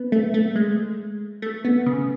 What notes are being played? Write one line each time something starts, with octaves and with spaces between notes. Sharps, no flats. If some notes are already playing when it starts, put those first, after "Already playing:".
Already playing: B3
A3
A3
G#3
A3
B3
C#3